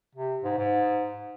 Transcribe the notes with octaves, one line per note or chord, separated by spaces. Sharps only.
C3
G#2
G#2